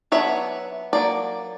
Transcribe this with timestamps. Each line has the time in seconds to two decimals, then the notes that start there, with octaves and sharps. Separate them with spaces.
0.12 F#3 B3 D4 C#5 E5
0.93 F#3 A#3 D5